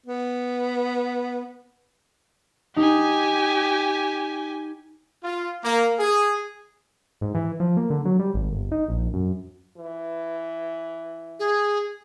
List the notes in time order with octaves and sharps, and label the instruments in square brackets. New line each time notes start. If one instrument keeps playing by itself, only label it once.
[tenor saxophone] B3
[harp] D#4 [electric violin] G4 G#5
[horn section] F4
A#3
G#4
[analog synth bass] G#2
E3
F3
A#3
D3
F#3
G3
G#1
G1
D#4
A#1
F#2
[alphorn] E3
[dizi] G#4